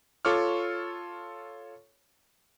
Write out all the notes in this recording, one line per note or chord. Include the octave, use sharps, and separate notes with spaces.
F4 A4 C#5 C#6 D6 F6